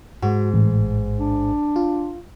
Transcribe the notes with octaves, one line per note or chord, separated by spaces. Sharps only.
G#2 F#4
A1
D4
F4